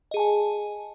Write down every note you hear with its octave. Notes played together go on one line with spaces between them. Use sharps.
G#4 D#5 G#5 A5